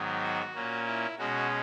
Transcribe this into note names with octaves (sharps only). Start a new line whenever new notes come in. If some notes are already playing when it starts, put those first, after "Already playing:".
Already playing: G#2 D#3 F#3 B3
F#4
A#2 A#3 C#4
E4
B2 G#3 C#4 F#4